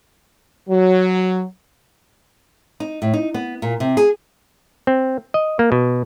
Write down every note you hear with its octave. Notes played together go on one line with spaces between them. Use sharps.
F#3
D#4
A2
D#4
B3
A#2
C3
G#4
C4
D#5
A#3
B2